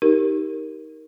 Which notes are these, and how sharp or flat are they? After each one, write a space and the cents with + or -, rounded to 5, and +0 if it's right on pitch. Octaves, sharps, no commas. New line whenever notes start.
D#4 +20 G4 +0 A#4 +0